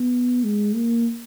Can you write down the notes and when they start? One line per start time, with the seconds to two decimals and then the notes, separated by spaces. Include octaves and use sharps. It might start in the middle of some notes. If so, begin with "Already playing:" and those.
Already playing: B3
0.44 G#3
0.75 A#3